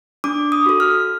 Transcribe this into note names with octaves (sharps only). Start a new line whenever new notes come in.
D4 D6
D#6
F#4 A4
F6